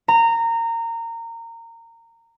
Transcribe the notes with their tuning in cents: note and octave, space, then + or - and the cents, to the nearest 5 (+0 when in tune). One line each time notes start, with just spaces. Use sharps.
A#5 -20